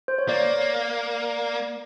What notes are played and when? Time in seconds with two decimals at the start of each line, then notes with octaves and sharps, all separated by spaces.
0.08 C5
0.18 C#5
0.29 A#3 D5